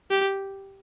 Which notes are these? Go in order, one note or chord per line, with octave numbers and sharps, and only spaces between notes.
G4